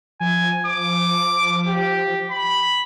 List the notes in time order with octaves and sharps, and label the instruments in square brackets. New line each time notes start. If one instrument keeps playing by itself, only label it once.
[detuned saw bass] F3 [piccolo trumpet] G#5
[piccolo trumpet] D6
G4
B5